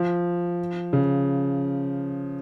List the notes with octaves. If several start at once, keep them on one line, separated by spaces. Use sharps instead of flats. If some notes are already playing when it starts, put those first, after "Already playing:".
Already playing: F3
C#3